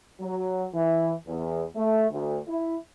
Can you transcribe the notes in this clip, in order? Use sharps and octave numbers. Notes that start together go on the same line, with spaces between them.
F#3
E3
E2
A3
D2
E4